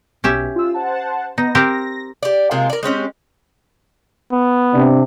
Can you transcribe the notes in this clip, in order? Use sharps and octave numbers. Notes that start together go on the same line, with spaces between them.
B1 C#4 G4 E5
F4 E6
C5 F#5 A5
B3 D#4 D#5 A#6
C4 G4 A#4 A#6
G4 D5
C3 G#3 A#3 F4
A#4 D5
G#3 C4 C#4 G4
B3
C3 D4